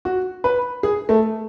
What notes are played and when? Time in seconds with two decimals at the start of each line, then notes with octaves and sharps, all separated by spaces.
0.05 F#4
0.44 B4
0.83 G#4
1.09 A3